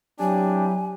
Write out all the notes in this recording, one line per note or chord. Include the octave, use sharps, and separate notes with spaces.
F#3 C4 D4 E4 G4 G#5